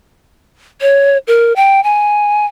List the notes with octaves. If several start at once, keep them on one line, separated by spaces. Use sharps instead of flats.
C#5
A#4
G5
G#5